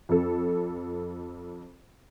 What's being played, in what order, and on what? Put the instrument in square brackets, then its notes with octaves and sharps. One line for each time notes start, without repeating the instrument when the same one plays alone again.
[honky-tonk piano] F2 A4